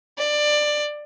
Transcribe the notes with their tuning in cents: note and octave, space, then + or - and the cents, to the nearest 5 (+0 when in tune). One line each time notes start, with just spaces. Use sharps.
D5 +15